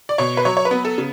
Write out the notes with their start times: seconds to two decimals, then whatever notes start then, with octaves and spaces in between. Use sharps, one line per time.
0.09 D5
0.18 B2 C#5
0.37 B4
0.45 F#3 C#5
0.57 C#5
0.65 B4
0.71 B3
0.85 A4
0.98 C#3